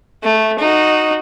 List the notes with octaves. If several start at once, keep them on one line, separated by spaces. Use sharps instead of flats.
A3
D#4 F#4